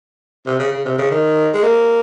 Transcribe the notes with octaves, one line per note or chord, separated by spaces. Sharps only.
C3
C#3
C#3
C3
C#3
D#3
G#3
A#3